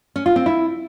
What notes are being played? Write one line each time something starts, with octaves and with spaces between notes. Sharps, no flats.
C#4
F4
C4
E4